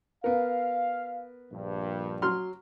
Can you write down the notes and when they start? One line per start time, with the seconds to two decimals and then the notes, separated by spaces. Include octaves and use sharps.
0.24 B3 A#4 F5
1.51 A#1 G2
2.22 F#3 C6 F6